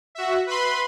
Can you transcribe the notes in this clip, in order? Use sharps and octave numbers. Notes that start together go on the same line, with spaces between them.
F#4 E5
B4 B5 C6